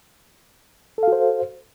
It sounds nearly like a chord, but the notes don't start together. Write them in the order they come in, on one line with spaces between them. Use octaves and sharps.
A4 F5 F#4 C5